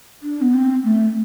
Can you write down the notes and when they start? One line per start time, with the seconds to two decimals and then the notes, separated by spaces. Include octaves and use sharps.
0.23 D4
0.41 B3
0.54 C4
0.84 A3